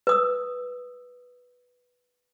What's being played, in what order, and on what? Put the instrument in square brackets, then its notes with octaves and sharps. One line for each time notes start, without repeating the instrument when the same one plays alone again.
[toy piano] B4 D#6 E6